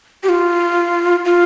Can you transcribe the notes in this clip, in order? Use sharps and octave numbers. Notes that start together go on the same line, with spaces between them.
G4
F4
F4